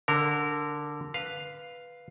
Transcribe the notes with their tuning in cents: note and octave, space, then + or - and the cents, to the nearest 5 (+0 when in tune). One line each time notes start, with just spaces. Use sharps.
D3 +0 A#4 -20
B4 +0 F5 +0